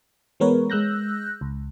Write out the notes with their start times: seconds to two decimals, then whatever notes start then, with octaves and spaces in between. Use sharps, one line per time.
0.40 E3 G#3 B3 A#4 B4 C#5
0.70 G#3 E6 F#6 G6 A#6
1.41 C#2